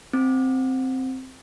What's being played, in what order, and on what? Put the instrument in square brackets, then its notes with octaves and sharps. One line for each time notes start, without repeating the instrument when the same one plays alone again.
[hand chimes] C4